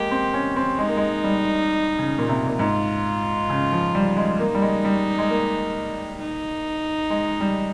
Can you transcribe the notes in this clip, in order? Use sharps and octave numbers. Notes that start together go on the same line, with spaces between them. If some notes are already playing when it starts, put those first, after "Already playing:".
Already playing: G#3 A#3 G4
C4
C#4
C4
G#3 D#4
A#3
G#3
G3
C#3
A#2
C3
A#2
G#2 F4
C#3
F3
G3
G#3
A#3 D#4
G3
G#3
G3
G#3
A#3
D#4
G#3
G3